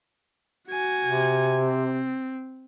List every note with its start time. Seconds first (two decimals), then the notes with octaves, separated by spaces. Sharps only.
0.69 F#4 G#5
1.05 C3
1.59 C4